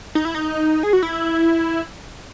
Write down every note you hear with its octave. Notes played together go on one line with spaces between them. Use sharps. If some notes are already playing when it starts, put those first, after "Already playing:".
D#4
E4
D#4
G#4
F#4
E4